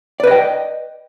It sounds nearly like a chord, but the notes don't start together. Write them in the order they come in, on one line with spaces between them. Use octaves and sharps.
D5 B4 D#5 G5